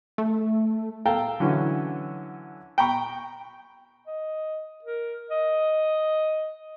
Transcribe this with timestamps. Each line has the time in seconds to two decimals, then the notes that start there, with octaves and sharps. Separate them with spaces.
0.18 A3
1.05 A4 F5 G5 A#5
1.40 D3 E3 F#3 C#4
2.78 G5 A#5 B5 C#6
4.07 D#5
4.84 A#4
5.31 D#5